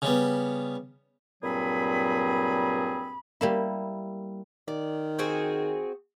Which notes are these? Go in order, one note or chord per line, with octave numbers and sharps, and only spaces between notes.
C#3 G3 B3
G2 A#2 F#3 C4 G#4 B5
G3 A#3 E4
D#3 D5
C4 F#4 G#4